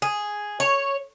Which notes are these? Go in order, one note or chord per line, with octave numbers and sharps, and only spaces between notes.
G#4
C#5